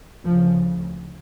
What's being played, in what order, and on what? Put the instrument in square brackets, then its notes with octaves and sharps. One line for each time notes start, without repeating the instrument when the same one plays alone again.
[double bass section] D2 C#3 F3